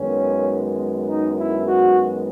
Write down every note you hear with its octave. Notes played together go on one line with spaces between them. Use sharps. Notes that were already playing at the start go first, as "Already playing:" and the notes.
Already playing: F#2 D#3 G#3 B3 C#4
D#4
E4
F#4